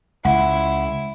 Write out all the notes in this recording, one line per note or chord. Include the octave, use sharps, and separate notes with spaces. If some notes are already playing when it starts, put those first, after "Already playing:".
C#2 E4 F#5